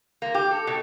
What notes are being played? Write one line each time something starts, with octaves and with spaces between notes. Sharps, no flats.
A#3
G4
A4
B2